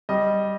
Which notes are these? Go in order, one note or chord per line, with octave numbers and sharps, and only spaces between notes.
G3 D#5